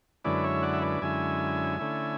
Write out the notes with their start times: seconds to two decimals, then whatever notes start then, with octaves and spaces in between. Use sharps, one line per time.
0.25 F#2 D3 G#3 C#4 E4 B4 D5
0.44 C#5 E5
0.63 D5 F#5
0.73 E5
0.82 B4 D5
1.01 F#2 D3 G#3 C#4 E4 E5 G#5
1.79 D3 A3 C#4 E4